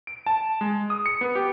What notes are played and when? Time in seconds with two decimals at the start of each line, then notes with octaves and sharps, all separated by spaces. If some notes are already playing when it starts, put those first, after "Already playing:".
0.07 D7
0.26 A5
0.61 G#3
0.90 D#6
1.06 C#7
1.21 B3
1.35 G4